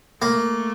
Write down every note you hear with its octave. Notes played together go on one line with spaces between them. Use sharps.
A3 A#3